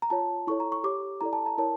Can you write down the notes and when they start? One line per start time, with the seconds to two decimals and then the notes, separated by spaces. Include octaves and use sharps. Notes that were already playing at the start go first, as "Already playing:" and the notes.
0.02 A#5
0.10 F4 C#5 A5
0.47 E4 A4 C#5 C#6
0.60 A#5
0.72 C#6
0.84 G4 C#5 D6
1.21 E4 A4 D5 A#5
1.33 A5
1.46 A#5
1.58 E4 A#4 C#5 A5